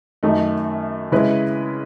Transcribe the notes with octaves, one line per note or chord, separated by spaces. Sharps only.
F#2 D#3 A3 D#4
C#3 G#3 C#4 E4 B4